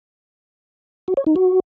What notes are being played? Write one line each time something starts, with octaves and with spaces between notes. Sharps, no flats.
F#4
C#5
D#4
F#4